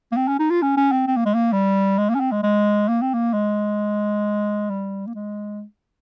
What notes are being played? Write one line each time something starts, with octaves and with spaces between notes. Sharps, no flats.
A#3
C4
C#4
D#4
F4
C#4
C#4
C4
C4
A#3
G#3
A#3
G3
G#3
A#3
C#4
C4
G#3
G#3
A#3
C4
A#3
G#3
G3
A#3
G#3